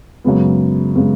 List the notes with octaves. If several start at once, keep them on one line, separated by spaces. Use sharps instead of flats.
F#2 C#3 G#3 B3
C#3 G#3 B3